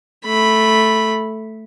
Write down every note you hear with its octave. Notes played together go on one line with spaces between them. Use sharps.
A3 B5